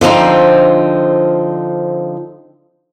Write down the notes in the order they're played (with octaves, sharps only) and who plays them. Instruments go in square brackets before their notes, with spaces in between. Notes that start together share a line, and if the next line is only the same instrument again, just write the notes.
[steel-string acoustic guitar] D3 F3 C4 D#4